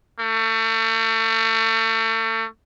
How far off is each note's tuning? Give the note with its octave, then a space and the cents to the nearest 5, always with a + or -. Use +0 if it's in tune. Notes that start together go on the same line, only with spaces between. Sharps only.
A3 +35